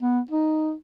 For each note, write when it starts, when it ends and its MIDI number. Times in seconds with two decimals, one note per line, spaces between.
0.02 0.20 59
0.31 0.73 63